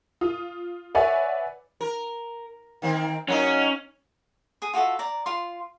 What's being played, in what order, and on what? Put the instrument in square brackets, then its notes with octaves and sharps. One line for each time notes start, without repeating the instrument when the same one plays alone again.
[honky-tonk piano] F4 D#6
B4 C#5 D5 E5 F#5 G#5
[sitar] A#4
D#3 A#3 C4
[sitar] F#3 A#3 D#4 [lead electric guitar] C#4
[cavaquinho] G#4 D#6
F4 F#4 A4 E5
D5 A#5
F4 C6